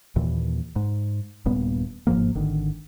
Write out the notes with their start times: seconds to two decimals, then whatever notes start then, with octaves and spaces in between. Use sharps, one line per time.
0.16 D#2 A#2 E3
0.76 G#2
1.46 D#1 G2 A#2 B3
2.07 G1 G#2 F3 A#3
2.35 G#1 D3 D#3